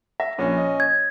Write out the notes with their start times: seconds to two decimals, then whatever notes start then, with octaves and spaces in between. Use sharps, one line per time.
0.20 E5 A#6
0.39 A#1 C#4
0.57 D#5
0.80 G#6